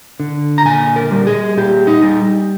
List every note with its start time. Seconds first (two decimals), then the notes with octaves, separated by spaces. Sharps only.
0.20 D3
0.58 A#5
0.65 A#2 G#5
0.96 A#4
1.11 G3
1.27 G#4
1.57 A#2 G4
1.87 D#4
2.02 G3